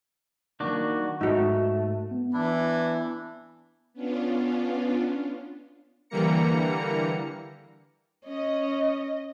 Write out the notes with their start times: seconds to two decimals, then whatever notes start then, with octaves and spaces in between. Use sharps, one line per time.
0.60 D#3 G3 A#3 D4 F#4 D6
1.21 G#2 A3 D#4 F#4
2.11 B3
2.33 E3 D4 E4
3.93 B3 C#4 D4 F4
6.10 D3 E3 G3 A#3 A#5 C#7
8.27 C#4 D#5